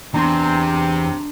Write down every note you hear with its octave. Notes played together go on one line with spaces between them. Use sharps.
E2 C3 D4 A#5 C6